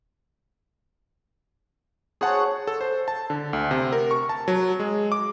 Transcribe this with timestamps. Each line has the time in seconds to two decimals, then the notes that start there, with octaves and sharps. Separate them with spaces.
2.21 F#4 G#4 C5 C#5 F#5 A5
2.67 A4
2.81 C5
3.08 A5
3.30 D3
3.53 D2
3.71 C3
3.92 A#4
4.11 C#6
4.29 A5
4.48 F#3
4.80 G#3
5.12 D6